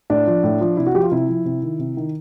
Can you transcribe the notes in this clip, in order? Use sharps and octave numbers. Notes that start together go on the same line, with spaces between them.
A2 D4
F3
A2
F3
C3 E4
F#4
F3 G4
F4
C3 E4
F3
C3
D#3
C3
D#3